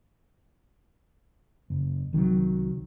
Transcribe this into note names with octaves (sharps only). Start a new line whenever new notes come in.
F#1
C2 D#3 F3 F#3